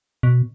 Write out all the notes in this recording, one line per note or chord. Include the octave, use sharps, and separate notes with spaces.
B2